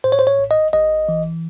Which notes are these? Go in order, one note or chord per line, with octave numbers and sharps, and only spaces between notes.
A2 C5
C#5
C5
C#5
A1
D#5
A1 D#5
E3